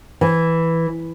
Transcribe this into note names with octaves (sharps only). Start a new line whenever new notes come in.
E3